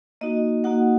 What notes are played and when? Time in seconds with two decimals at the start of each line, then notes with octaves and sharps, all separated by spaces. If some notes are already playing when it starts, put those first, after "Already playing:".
0.21 A#3 D#4 F#4 D#5
0.64 A#3 D#4 F#4 F#5